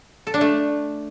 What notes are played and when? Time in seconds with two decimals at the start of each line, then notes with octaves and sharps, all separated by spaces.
0.27 A4
0.34 D4
0.41 A3